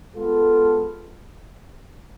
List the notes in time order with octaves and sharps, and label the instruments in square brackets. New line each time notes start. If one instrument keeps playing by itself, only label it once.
[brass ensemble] G#3 B3 F4 A4